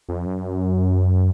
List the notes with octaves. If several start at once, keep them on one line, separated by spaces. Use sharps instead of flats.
F2
F#2